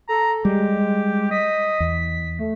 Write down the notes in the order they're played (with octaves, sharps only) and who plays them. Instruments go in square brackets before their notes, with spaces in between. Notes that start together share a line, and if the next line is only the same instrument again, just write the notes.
[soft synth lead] A4 [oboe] A#5
[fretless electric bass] G3 [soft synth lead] G#3 [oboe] G4
[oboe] D#5 [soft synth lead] B6
[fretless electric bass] E2
[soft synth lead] A3